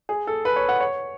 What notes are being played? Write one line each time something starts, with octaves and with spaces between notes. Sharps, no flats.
G#4
A4
B4
C#5
F#5
C#5